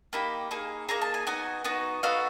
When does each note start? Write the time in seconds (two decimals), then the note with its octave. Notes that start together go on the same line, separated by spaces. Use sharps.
0.13 A#3 D#4 G4 B5
0.51 A#3 D#4 G#4
0.89 A#3 D#4 G#4 A#5
1.02 A5
1.14 G#5
1.27 B3 D#4 F#4 G#5
1.64 B3 D#4 F#4
2.03 B3 D#4 F#4 A4 F5